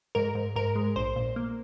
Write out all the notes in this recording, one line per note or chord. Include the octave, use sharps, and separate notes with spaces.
G#2 A#4
G#2
G#2 A#4
G#3
A#1 C5
A#2
A#3